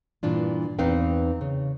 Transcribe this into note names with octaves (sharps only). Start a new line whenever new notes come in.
G2 A#2 E3 D4 F4
E2 C4 D#4 B4 F5 G5
C#3